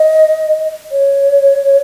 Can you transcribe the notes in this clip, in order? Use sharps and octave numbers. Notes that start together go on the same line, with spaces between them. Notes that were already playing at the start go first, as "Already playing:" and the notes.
Already playing: D#5
C#5